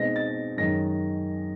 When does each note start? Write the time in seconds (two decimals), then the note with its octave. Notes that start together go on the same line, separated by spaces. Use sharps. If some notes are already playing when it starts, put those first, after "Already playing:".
Already playing: B2 G#3 C4 D#4 A#6
0.16 A6
0.57 F#2 D#3 G#3 C#4 A#6